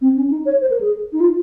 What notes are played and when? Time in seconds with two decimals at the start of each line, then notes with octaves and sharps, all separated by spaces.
0.01 C4
0.16 C#4
0.31 D#4
0.46 C#5
0.61 C5
0.70 A#4
0.81 G#4
1.13 D#4
1.20 F4